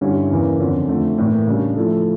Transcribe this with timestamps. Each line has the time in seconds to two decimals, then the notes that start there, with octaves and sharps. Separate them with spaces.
0.01 G2 D3 G3 C#4 E4
0.31 E2 C#3 E3 A#3
0.59 F2 D3 F3 C#4
0.88 F2 D3 A3
1.18 A2 E3 A#3
1.47 C#3 G3 D4
1.76 F3 A3 E4 A4